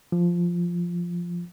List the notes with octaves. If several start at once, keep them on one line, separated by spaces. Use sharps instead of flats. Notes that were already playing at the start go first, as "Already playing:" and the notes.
F3